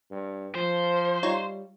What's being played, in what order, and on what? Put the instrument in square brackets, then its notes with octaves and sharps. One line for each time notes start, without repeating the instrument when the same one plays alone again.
[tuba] G2
[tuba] F3 [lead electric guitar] C5
[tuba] G3 [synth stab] D#4 F4 C#5